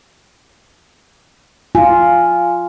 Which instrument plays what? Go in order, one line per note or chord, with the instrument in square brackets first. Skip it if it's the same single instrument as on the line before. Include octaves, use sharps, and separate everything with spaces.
[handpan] F4 [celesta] G#5